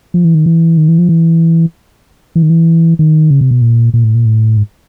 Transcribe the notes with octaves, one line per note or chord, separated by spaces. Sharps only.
F3
E3
D#3
E3
D#3
E3
F3
E3
E3
D#3
E3
D#3
C#3
C3
B2
A#2
A#2
A2
A#2
A2
G#2